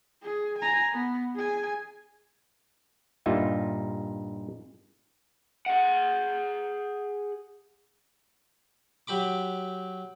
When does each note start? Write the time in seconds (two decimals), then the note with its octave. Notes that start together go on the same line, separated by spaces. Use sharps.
0.22 G#4
0.58 G#5 A#5
0.93 B3
1.35 G#4 G#5
3.26 G2 A#2 D#4 F4 E5
5.66 G#4 F#5
9.07 F#3 G4 B5 D6